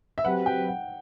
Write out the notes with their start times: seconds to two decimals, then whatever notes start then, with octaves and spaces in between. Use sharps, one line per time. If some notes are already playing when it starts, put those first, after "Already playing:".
0.18 E5
0.25 F#3 C4 G4 B4 F#5
0.46 G5
0.68 F#5